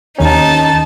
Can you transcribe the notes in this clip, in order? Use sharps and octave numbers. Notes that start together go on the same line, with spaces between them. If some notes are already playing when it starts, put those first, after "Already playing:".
D#2 D#3 C#4 D#4 A5